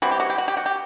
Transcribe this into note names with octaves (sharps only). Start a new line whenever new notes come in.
E3 G3 C4 F#4
G4
F#4
G4
F#4
G4
F#4
G4